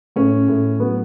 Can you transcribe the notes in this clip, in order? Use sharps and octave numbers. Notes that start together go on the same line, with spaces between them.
A2 C#4
A2
F#3 B3